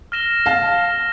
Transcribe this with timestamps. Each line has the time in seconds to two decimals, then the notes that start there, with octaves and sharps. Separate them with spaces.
0.12 F6 A#6 E7 G7
0.46 F5 A5